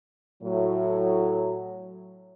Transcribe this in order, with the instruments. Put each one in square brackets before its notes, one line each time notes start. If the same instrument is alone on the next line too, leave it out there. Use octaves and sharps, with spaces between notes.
[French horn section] A2 F#3